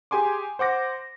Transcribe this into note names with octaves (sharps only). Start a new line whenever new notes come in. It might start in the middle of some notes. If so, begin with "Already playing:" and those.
G4 G#4 G#5 C6 D6
C5 F#5 D6 A#6